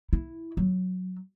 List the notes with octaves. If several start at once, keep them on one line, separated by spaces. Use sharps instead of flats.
E4
F#3